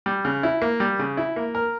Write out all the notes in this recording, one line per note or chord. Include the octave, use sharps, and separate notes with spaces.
G3
C#3
E4
A#3
G3
C#3
E4
A#3
A#4